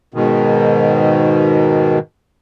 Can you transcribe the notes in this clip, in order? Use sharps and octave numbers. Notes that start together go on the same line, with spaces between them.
G#2 B2 D#3